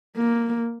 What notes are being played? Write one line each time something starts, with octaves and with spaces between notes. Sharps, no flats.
A#3